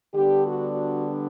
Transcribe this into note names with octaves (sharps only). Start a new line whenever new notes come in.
D3 G3 B3 D4 G4
F#4
F#4